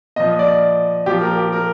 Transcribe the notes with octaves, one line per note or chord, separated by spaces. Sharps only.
A#2 F3 D#5
D5
A#2 F3 G4
A#4
G4
A#4